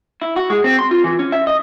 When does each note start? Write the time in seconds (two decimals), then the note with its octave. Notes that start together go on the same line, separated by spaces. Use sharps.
0.22 E4
0.36 F#4
0.50 G#3
0.64 C4
0.79 C6
0.91 F4
1.04 E3
1.19 C#4
1.32 E5
1.47 D#5